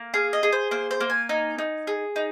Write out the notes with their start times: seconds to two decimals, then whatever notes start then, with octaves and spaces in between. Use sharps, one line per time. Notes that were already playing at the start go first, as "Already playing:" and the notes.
Already playing: A#3
0.14 G#4 F5
0.33 D#5
0.43 G#4
0.52 C5
0.71 A#3 C5
0.91 C5
1.00 A#3
1.10 G#5
1.29 D#4
1.58 D#4
1.87 G#4
2.16 D#4